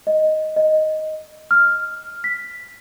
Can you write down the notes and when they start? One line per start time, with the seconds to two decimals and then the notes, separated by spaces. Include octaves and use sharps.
0.07 D#5
0.56 D#5
1.51 F6
2.24 B6